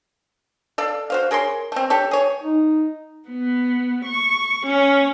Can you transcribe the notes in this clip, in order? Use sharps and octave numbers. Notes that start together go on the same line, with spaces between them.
A4 D5 F5
F#4 C5 F5
G#4 A#4 C#5 C6
A3 C4
G4 A4 C#5
G#4 C#5
D#4
B3
C#6
C#4